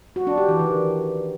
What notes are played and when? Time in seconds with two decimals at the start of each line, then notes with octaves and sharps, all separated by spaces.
0.16 F#4
0.27 D4
0.38 G4
0.48 E3
0.59 D#3